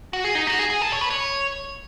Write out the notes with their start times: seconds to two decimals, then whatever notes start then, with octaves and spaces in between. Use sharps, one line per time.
0.13 F#4
0.24 G#4
0.35 D#4
0.47 F#4
0.59 G#4
0.70 G#4
0.81 A4
0.92 C#5
1.01 B4
1.10 C#5